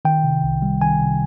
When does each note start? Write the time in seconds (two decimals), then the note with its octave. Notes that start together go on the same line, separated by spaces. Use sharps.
0.05 D#3 G5
0.24 C3
0.43 C2
0.62 G3
0.81 D#3 G#5
1.00 C3